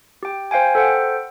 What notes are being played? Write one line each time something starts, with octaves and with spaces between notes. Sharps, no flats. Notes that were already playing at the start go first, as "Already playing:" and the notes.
G4 G5
C5 F5 G5 G#5
A4 C5 F#5 G5